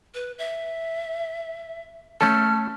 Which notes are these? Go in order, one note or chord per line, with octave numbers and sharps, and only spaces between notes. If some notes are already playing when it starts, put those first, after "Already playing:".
B4
E5
A3 C#4 A4 A5 F6